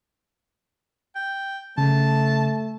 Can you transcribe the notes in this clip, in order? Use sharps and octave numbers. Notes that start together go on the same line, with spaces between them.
G5
C#3 A3 A5